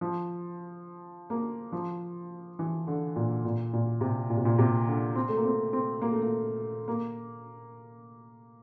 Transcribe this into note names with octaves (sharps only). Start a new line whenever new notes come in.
F3
A#3
F3
E3
D3
A#2
A#2
A#2
C3
A#2
C3
A#2
C3
D3
C4
A3
A#3
C4
C4
A#3
A3
A#3
A#3